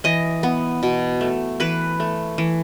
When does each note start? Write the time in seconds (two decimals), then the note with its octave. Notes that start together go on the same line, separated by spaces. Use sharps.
0.04 E3 D#5
0.43 B3
0.83 B2
1.21 A3
1.60 E3 B4
2.00 A3
2.38 E3